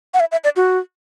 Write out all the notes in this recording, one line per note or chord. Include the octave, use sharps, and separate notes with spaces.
F#5
E5
E5
D5
F#4